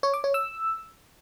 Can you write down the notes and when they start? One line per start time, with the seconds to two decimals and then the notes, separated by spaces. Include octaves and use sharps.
0.03 C#5
0.14 D6
0.24 C#5
0.34 E6